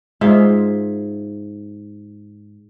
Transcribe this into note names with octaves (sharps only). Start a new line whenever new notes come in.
G#2 F4 G#4 E5